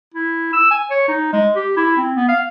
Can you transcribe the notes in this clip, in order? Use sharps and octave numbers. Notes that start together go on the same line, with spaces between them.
E4
E6
G#5
C#5
D#4
G#3
G4
E4
C4
B3
F5